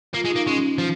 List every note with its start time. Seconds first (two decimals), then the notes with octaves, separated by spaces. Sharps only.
0.14 A#3 F4
0.25 G#3
0.31 D#4
0.36 A#3
0.47 G#3 C#4
0.78 F3